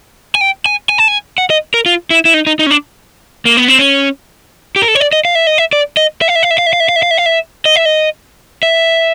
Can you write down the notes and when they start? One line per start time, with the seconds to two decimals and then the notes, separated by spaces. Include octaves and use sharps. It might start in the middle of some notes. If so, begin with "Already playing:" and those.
0.35 G#5
0.41 G5
0.66 G#5
0.89 G#5
0.98 A5
1.08 G#5
1.38 F#5
1.50 D#5
1.74 A#4
1.86 F4
2.10 E4
2.25 E4
2.34 D#4
2.47 D#4
2.59 D#4
2.67 C#4
2.71 D4
3.45 A#3
3.57 B3
3.68 C4
3.79 C#4
4.76 G4
4.82 A#4
4.88 A4
4.95 C#5
5.00 D5
5.13 D#5
5.25 F5
5.35 E5
5.47 D#5
5.58 E5
5.73 D5
5.97 D#5
6.21 E5
6.28 F5
6.35 E5
6.43 F5
6.51 E5
6.58 F5
6.66 E5
6.73 F5
6.80 E5
6.89 F5
6.96 E5
7.03 F5
7.11 E5
7.18 F5
7.26 E5
7.65 D#5
7.76 E5
7.85 D#5
8.63 E5